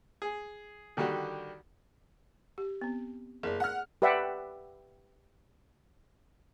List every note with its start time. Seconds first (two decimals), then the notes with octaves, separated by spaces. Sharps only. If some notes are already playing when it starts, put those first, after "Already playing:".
0.22 G#4
0.97 D3 D#3 G3 F#4 G4
2.58 G4
2.81 B3 C4
3.43 F#1 G#4 D5
3.60 F#5 F6
4.02 G4 B4 D5 E5 F#5